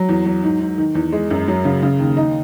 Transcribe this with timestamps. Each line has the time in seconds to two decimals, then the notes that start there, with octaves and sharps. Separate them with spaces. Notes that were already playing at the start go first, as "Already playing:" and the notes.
Already playing: F#3
0.09 E2
0.26 F#3
0.42 G#2
0.60 G#2
0.78 D#3
0.95 E2
1.12 G#3
1.31 F#2
1.48 F#3
1.65 C#3
1.82 C#3
1.99 D#2
2.17 D#4